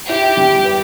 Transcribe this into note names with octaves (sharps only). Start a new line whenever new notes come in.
E4 G4
G3
B4